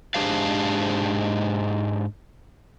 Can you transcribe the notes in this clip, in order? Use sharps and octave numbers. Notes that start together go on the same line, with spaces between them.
G#2 D4 G4 G#4 C5 F5